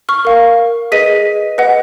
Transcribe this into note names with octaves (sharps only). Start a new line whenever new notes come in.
C#6 F6
A#4 F5
G#4 B4 D#5 B6 D#7
B4 D#5 F#5